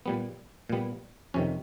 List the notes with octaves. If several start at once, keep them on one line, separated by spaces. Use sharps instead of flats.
A#2 G3 B3
A#2 G3 B3
F2 C3 D#3 C#4